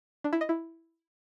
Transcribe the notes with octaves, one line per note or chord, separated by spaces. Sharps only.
D4
E4
D#5
E4